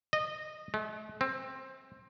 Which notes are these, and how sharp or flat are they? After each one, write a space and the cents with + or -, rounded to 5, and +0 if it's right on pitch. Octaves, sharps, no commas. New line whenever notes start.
D#5 -20
A3 -45
C4 +15